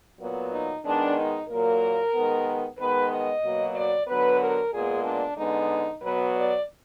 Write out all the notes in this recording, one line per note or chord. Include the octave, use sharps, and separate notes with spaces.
A#2 F#3 B3
D#4
D#3 G#3 B3 D4
D#4
A#2 F#3 A#3 A#4
D#3 G#3 B3
D#3 G#3 B3 B4
D#5
B2 F#3 A#3
D5
D3 F#3 B3 B4
A#4
A#2 G#3 B3 G#4
D4
D3 G#3 B3 D#4
B2 F#3 B3 B4
D5